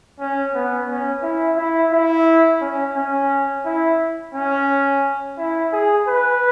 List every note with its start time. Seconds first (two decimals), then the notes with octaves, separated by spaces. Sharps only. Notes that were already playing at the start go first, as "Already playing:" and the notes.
0.20 C#4
0.54 B3
0.89 C#4
1.23 E4
1.57 E4
1.92 E4
2.61 C#4
2.96 C#4
3.65 E4
4.34 C#4
5.38 E4
5.73 G#4
6.07 B4